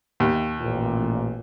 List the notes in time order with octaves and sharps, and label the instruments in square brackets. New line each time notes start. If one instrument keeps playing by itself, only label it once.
[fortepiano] D#2
[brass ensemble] A1 A#2